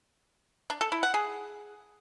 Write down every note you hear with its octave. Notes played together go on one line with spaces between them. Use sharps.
D4
A4
E4
F#5
G#4